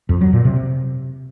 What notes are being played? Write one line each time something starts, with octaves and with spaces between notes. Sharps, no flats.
F2
F#3
A#2
C3